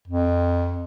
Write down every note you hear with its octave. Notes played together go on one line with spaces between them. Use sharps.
F2